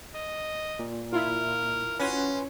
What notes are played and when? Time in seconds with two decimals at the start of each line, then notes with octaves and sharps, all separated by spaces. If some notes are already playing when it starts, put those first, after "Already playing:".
0.14 D#5
0.79 A#2
1.13 E4 F4 A#4
1.99 C#4 F#4 B4 G#5 C6